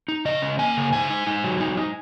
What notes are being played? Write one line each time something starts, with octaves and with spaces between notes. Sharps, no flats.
D#4
C#3 D#5
C#4
A#3 G#5
C#3
D#4 G#5
D#4
D#4
F#3
D#4
D#4